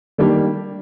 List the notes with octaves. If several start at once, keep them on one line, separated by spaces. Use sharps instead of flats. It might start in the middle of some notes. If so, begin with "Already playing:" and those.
D#3 G3 A#3 D4 G4